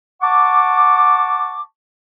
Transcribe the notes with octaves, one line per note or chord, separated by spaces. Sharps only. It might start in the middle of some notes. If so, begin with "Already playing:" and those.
F#5 A5 C#6 D6